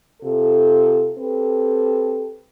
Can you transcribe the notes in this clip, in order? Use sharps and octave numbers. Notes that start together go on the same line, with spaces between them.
C3 F4 A4
C4 G4 A4 B4